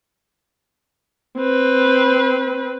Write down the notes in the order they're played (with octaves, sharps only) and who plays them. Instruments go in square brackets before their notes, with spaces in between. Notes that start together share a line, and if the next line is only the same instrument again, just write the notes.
[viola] C4 B4